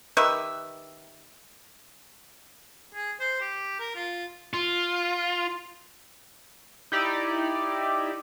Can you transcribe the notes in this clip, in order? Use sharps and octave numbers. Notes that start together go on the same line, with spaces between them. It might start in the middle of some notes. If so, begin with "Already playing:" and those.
D#3 G4 B4 E5
G#4
C5
G4
A#4
F4
F4
D#4 E4 G4 D5